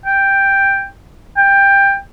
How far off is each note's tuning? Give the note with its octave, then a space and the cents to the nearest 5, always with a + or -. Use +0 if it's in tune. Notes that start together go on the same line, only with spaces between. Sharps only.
G5 +5
G5 +15